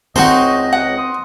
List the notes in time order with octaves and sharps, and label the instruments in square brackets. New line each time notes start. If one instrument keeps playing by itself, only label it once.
[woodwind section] C#2 D#5 [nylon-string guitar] C4 [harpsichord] D#4 F#4 C5 [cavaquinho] C6 C#6
[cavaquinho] F#5
[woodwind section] C6 D#6